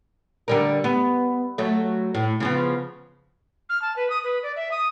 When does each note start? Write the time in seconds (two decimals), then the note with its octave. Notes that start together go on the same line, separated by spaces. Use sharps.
0.48 D3 G3 A#4
0.84 B3
1.58 F#3 A3
2.15 A2
2.40 C#3 F3 B3
3.69 F6
3.82 A5
3.96 B4
4.10 D#6
4.24 B4
4.43 D5
4.56 E5
4.71 D#6